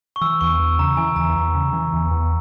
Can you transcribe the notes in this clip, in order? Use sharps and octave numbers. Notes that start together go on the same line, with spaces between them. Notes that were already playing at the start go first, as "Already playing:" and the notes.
C#6
E3 E6
E2 C#6
E2
C#3 A#5
E3 G#5
E2 A#5
E2
C#3
E3
E2
E2